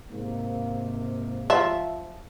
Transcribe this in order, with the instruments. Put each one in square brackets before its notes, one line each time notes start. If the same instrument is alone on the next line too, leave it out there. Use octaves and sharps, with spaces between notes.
[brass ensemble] G#2 C3 A#3
[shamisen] F3 E5